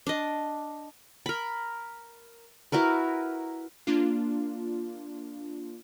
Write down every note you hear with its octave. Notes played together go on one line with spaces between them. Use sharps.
D4 D#5
A#4 B5
E4 F#4 A#4 B4
A#3 D4 F4